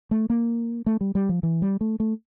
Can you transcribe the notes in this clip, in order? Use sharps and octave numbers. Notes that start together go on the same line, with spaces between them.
A3
A#3
A3
G3
G3
F3
E3
G3
A3
A3